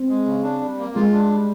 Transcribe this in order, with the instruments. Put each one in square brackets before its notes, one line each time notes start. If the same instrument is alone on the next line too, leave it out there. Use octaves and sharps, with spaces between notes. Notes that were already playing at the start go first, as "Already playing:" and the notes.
Already playing: [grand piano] C4
[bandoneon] G#3
C#3
D4
G3
A#3
[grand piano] G#3 [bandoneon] F4
[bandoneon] D4
G3